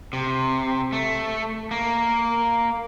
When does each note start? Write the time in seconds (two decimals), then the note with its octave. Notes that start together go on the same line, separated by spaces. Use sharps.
0.13 C3
0.93 A3
1.71 A#3